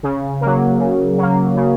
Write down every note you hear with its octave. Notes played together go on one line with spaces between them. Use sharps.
C#3
F#3 A#3
C#3
F#3 A#3
C#3